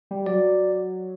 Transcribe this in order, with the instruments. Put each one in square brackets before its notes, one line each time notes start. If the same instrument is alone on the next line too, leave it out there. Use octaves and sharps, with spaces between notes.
[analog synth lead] G3
[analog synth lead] F#3 [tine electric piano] D5